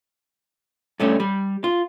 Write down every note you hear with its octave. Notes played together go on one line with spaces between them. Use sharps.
G2 A3 C#4
G3
F4